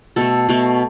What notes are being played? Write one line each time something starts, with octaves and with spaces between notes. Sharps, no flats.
B2 A3 A4
B2 A3